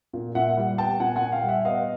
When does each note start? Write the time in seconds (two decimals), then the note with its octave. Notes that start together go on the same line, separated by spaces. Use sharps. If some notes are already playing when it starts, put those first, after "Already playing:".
0.13 A#2
0.35 A#2 E5 F#5
0.57 G3
0.78 B3 G5 A5
1.00 A#2 F#5 G#5
1.16 F#5 G#5
1.22 A#2
1.32 F5 G5
1.43 G3
1.49 E5 F#5
1.65 B3 D#5 F5